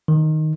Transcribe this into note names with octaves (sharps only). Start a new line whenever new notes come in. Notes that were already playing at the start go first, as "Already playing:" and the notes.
D#3